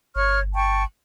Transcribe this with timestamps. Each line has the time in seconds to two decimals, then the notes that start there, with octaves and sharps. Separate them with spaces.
0.16 G1 C#5 C#6 F6
0.54 G5 A5 C#6